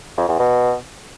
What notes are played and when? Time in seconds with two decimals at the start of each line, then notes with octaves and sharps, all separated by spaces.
0.17 F2
0.28 E2
0.39 B2